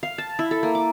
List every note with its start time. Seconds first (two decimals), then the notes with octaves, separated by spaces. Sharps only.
0.03 F5
0.18 A5
0.39 E4
0.51 A4
0.63 A#3
0.75 D6